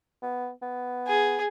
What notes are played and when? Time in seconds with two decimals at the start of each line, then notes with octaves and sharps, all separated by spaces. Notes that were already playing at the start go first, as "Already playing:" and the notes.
0.23 B3
0.62 B3
1.07 G#4